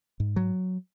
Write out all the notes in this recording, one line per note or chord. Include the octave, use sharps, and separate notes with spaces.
G#2
F#3